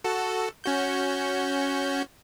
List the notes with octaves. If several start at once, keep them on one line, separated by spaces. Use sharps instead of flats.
F#4 A4
C#4 F#4 G6